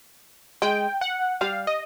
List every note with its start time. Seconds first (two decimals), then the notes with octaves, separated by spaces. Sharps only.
0.62 G#3 G5
1.01 F#5
1.41 G3 F5
1.67 D#5